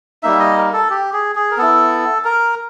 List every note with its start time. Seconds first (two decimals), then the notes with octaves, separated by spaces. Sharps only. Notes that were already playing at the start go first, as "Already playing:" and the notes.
0.23 G3 A#3 D#4 E5
0.40 D#5
0.57 A#4
0.73 A4
0.90 G4
1.13 G#4
1.36 G#4
1.51 A#4
1.58 B3 E4 A4
2.25 A#4